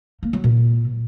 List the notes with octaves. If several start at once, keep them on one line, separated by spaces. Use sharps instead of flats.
A#3
F#3
A#2